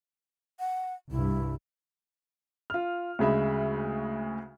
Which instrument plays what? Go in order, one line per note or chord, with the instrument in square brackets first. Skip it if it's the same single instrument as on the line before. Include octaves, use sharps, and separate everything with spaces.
[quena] F#5
[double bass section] C2 G2 [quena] E4
[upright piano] F4 F6
D2 C#3 G#3 E5 B5